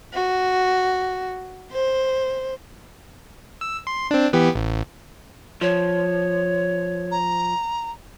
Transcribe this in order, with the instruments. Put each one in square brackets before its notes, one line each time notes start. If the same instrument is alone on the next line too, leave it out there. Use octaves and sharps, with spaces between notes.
[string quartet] F#4
C5
[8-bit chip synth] E6
C6
C4 D4
E3 B3 G4
A1
[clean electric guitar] F3 [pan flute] C#5
[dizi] A#5